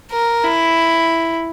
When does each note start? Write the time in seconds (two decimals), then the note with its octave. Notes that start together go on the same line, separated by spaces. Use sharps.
0.12 A#4
0.44 E4